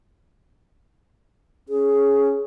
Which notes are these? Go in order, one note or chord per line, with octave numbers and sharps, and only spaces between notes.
C#4 G#4